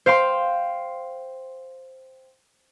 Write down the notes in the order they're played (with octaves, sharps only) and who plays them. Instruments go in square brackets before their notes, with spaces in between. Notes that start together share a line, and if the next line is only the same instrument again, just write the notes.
[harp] C5 F5 G5 C6